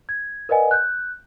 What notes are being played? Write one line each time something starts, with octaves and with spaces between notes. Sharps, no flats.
G#6
A#4 B4 D5 D#5 F#5 G#5
F#6 G6